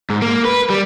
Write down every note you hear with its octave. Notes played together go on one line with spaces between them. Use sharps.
G#2
A#3
B4
G3